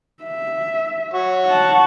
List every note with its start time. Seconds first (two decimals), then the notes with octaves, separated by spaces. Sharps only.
0.23 E5
1.13 F#4 C#5
1.46 F#5 A5